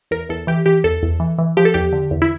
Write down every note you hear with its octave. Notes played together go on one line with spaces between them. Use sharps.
E2 A#4
E2 A4
E3 G4
E3 G4
E2 A4
E2
E3
E3
F3 G4
A4
E2 G4
D3
E2
E4